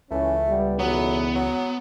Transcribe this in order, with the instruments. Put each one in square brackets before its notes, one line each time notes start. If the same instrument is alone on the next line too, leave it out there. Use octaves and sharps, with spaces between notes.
[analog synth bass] C#2 [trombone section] E3 C#4 [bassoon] A3
[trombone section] G3 B3
[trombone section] B1 E2 [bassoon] F#3 [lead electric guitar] B3
[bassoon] F#3